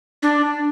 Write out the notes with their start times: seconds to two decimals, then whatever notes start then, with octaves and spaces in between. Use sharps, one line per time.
0.23 D4